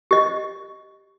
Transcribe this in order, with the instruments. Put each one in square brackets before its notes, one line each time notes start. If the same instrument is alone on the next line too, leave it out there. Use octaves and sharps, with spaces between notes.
[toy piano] G4 D#5